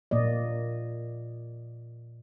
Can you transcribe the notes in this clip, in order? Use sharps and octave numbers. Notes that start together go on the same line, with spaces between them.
A#2 A#3 D5 D#5